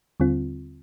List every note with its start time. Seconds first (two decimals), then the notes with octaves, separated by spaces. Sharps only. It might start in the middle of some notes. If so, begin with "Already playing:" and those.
0.20 D#2 D3 G3 C4 F4